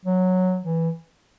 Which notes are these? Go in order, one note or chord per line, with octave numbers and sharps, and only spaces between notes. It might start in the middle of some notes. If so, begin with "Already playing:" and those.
F#3
E3